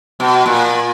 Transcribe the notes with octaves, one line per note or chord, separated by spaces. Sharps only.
B2
A#2